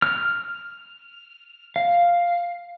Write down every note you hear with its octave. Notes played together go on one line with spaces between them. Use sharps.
F6
F5